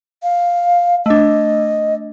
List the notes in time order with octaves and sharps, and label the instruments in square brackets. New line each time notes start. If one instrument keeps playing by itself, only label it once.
[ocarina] F5
[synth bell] A3 D4 [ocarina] D#5